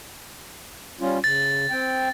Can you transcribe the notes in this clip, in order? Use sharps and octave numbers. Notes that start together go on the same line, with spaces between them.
G3 C#4 F4
C#3 A6
C4 G5